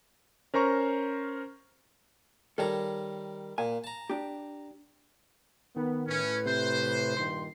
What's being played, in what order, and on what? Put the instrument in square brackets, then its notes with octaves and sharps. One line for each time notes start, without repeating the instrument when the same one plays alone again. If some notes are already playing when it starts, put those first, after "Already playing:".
[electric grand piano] C#4 A#4 C5 A#5 C#6
[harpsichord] D#3 G3 A#5 [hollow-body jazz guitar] A4 C#5 F5
[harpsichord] A#2 [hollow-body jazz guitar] G#5
[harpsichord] A5 A#5
[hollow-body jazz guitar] D4 G4
[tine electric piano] D#3 [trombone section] B3
[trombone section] A2 B4 [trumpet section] C#4
[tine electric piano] C3 [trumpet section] C5
[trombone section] G2 A#2 D#3 [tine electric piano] C6 C7